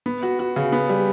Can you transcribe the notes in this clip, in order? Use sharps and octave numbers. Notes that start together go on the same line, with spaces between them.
B3
F#4
F#4
C#3
B3
G3